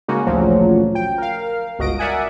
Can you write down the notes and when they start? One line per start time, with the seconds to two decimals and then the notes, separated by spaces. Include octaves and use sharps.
0.08 C#3 G#3 A#3 C#4 D#4 F#4
0.26 A1 D2 A#2 C#3 F3 F#3
0.95 G5
1.18 A#4 F5
1.79 G1 C#2 F#4 D#5 A#6 D7
1.99 A#4 D5 E5 F#5 G#5 D#6